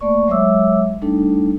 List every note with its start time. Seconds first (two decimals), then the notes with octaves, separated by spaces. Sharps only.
0.01 A3 A#3 D5 C#6
0.27 F#3 G#3 C#5 E5 D6 E6
1.02 G3 A3 D4 D#4 A4